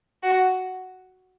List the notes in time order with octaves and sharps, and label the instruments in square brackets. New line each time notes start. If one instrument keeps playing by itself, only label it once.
[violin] F#4